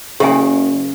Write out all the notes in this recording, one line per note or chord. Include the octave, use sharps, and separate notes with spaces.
F#1 C#3 G4 E5 G#5